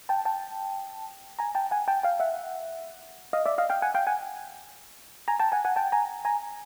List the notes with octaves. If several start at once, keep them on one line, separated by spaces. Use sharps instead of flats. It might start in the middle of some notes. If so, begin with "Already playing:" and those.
G5 A5
G5 A5
G#5 A#5
G5 A5
F#5 G#5
G5 A5
F5 G5
E5 F#5
D#5 F5
D5 E5
D#5 F5
F5 G5
F#5 G#5
F5 G5
F#5 G#5
G#5 A#5
G5 A5
F#5 G#5
F#5 G#5
G5 A5
G#5 A#5
G#5 A#5